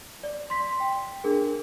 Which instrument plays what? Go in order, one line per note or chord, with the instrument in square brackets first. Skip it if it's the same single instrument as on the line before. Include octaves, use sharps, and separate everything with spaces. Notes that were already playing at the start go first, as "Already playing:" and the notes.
[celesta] D5
C6 B6
G5
D4 G#4 A#4